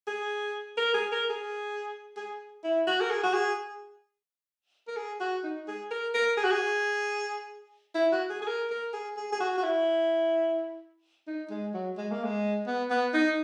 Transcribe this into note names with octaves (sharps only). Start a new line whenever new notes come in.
G#4
A#4
G#4
A#4
G#4
G#4
E4
F#4
A#4
G#4
F#4
G#4
A#4
G#4
F#4
D#4
G#4
A#4
A#4
G#4
F#4
G#4
E4
F#4
G#4
G#4
A#4
A#4
G#4
G#4
G#4
F#4
F#4
E4
D#4
G#3
F#3
G#3
A#3
G#3
B3
B3
D#4